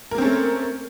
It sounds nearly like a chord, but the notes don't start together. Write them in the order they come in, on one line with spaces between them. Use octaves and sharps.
A#4 A#3 C4 C#4 A3